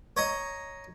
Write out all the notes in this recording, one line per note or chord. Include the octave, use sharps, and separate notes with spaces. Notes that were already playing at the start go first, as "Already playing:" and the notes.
C#5 D#5 A#5